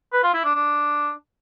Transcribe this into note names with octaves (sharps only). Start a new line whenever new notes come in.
B4
F4
E4
D4
D4